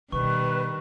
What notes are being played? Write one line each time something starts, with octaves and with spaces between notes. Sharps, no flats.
B2 D#3 G3 B4 C#6